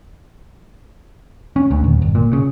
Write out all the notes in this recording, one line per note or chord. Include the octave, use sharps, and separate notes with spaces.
C#4
D2
D#1
G1
A#2
C#3